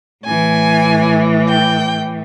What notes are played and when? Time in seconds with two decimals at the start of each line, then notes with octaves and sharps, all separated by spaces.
0.25 A2 E3 G#5
1.48 G5